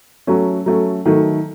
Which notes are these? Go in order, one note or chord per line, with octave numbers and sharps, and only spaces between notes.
F#3 A3 C#4
F#3 A3 C#4
D#3 F#3 A3